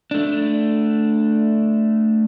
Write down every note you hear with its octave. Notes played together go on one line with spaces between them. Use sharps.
A3 D4